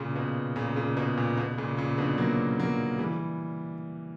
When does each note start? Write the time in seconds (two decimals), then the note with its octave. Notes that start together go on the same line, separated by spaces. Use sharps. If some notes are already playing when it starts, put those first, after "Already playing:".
Already playing: A#2 C#3
0.16 B2
0.56 A#2 C#3
0.76 A#2 C#3
0.97 B2
1.17 A#2
1.37 B2
1.58 A#2 C#3
1.77 A#2 C#3
1.98 B2 D3
2.18 F#3 A#3
2.60 F#3 A#3
2.99 E3 G3